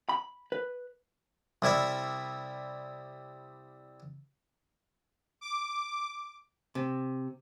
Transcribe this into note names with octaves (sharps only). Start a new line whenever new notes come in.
B5
B4
C2 G3 E4 E5
D6
C3